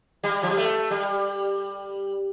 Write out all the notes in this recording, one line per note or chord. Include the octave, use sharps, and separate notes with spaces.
G3
F3
G3
A3
G3